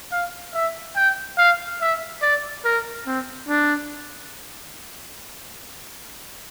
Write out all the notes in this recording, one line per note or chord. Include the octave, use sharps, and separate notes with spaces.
F5
E5
G5
F5
E5
D5
A#4
C4
D4